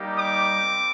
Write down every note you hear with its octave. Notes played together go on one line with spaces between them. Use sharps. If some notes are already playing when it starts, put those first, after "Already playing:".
Already playing: G3 A#3 D#4 G4
D6
C4